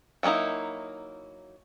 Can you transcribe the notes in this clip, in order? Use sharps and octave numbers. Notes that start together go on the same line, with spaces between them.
F#3 A#3 C#4 D#4 E4